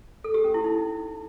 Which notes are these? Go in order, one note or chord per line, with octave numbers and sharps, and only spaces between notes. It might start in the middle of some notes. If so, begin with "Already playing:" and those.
A4
G4
C#4
E4
D#4